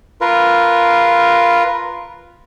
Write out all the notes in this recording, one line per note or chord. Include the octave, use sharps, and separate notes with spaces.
F4 A#4 B4